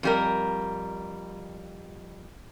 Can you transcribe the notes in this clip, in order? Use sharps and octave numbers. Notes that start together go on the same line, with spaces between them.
F2 G3 A#4